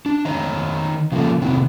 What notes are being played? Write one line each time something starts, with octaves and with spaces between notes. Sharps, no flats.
D4
D#3 C5 C#5 D#5 A#5
C#3 F3 A#3 A4
C3 D#3 C4 E4 F#4